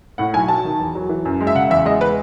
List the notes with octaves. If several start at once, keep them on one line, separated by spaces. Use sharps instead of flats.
A2 F#5
B1 G#5
F#3 A5
D#3
E2
F#3
E3
F#2
G#3
E5
C#3 F#5
E2 E5
G#3 D#5
B4